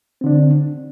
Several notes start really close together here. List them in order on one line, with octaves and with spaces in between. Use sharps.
C4 D3 D4